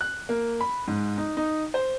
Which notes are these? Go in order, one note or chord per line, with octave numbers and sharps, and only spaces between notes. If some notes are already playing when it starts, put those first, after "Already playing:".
F#6
A#3
B5
G#2
D#4
D#4
C5